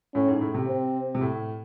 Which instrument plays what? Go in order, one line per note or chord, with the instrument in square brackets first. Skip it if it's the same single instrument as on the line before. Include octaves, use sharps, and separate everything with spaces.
[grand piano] A2 [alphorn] C#4
[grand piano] G#2
A2
C3
[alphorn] C4
[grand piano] C3
A2